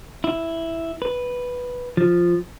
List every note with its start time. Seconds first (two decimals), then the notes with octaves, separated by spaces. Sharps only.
0.24 E4
1.02 B4
1.97 F3